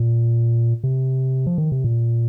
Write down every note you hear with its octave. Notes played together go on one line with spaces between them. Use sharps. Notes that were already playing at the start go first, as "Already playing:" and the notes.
Already playing: A#2
C3
F3
D#3
C3
A#2